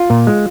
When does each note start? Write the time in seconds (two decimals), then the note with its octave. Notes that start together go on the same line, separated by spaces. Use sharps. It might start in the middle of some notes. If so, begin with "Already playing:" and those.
Already playing: F4
0.10 A#2
0.27 G#3